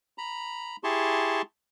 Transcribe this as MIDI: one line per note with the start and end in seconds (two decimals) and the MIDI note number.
0.18 0.76 82
0.18 0.76 83
0.84 1.42 64
0.84 1.42 67
0.84 1.42 68
0.84 1.42 81
0.84 1.42 84
0.84 1.42 85